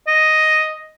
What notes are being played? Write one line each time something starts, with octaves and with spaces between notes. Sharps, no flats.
D#5